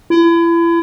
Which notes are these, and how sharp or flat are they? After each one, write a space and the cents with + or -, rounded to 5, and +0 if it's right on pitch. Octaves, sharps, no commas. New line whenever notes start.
E4 +35